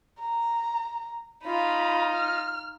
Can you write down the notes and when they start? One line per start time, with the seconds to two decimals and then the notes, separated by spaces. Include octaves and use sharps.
0.20 A#5
1.44 D#4 F4 B5
2.13 F6